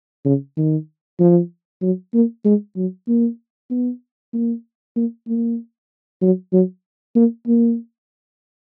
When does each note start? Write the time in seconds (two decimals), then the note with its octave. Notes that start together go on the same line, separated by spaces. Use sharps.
0.25 C#3
0.57 D#3
1.20 F3
1.82 F#3
2.14 A#3
2.45 G#3
2.76 F#3
3.08 A#3
3.70 B3
4.33 A#3
4.96 A#3
5.28 A#3
6.22 F#3
6.53 F#3
7.16 A#3
7.47 A#3